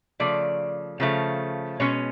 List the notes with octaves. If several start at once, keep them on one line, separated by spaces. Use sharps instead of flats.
C#3 F3 A3 D5
C#3 F3 A3
B2 G#3 C#4 C#5